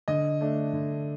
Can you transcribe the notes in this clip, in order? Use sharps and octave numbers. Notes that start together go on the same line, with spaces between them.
D3 D#5
A3 D4
D3